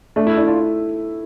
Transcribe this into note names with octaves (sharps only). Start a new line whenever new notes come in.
A3 D4
E4
D4 E4
D4 F4